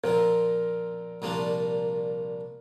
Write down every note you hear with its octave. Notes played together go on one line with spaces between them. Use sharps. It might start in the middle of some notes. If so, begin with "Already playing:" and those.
A#2 F3 C4 A#4
C2 A#2 F3 A#3 D4